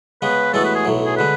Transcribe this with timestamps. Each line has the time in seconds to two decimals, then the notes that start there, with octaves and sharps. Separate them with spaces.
0.22 C#3 G#3 B3 B4
0.54 A1 A2 G#3 B3 F#4 A4
0.65 B4
0.75 G#4
0.85 B1 A2 F#3
1.06 G#4
1.17 D3 G#3 B4